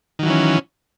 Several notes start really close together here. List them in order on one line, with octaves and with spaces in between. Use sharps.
D#3 F#3 E3 C#4